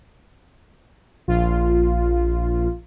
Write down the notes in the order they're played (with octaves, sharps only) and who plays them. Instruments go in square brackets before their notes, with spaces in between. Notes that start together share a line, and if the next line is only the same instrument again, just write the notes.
[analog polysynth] A#1 F4